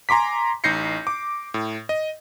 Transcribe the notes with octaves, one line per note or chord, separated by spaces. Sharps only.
G#5 A#5 C6 D6 B6
A1 D#4 G6 A#6 C7 C#7
D6
A2
D#5